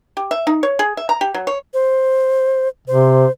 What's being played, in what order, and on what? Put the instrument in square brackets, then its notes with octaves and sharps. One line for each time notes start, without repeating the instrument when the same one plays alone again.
[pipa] G4
E5
D#4
C#5
G#4
E5
A#5
G4
F#3
C#5
[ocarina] C5
[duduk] C3 [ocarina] C5